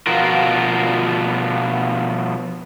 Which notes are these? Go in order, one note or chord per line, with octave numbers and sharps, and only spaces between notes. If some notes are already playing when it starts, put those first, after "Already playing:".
B2 F3 F4 F#4 A#4